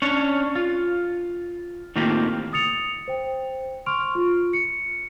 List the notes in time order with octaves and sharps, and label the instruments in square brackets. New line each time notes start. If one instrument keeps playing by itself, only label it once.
[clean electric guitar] C#4 D4 C#5
F4
A2 D#3 A#3 C4 F4 G4
[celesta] D#6 A6 C#7 F7
C5 G5
C6 C#6 F6 D7 F7
F4
C#7